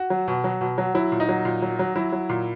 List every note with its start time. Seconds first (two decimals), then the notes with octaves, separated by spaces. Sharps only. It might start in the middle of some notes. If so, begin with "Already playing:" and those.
Already playing: F#4
0.10 F#3
0.28 B2
0.44 F#3
0.61 B2
0.78 F#3
0.95 F#3 E4
1.12 A#2
1.20 D#4
1.29 F#3
1.45 A#2
1.62 F#3
1.79 F#3
1.96 F#3 E4
2.12 F#3
2.29 A#2